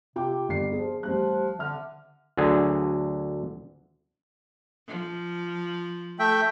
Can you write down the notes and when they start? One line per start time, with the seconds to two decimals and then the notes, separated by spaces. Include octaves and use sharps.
0.16 C3 F4 G5 D6
0.49 G1 D#2 C7
0.73 F3 G#4
1.03 A1 F3 G3 F#6
1.59 D3 E5 F6
2.37 D2 D3 F#3 G#4
4.88 F3
6.19 A3 E5 G5